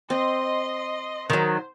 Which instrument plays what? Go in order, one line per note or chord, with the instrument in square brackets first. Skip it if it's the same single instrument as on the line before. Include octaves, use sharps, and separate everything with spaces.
[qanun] C4 [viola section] D#5 C6
[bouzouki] D#3 F#3 [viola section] C5